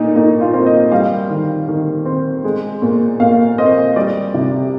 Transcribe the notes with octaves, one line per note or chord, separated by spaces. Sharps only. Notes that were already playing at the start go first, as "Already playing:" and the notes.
Already playing: A#2 D#4
A#2 D#4
F4
C4
D#5
G3 F5
D#3
D#3
C4
G#3
A#2
A#2 F5
C4 D#5
G3 D5
C3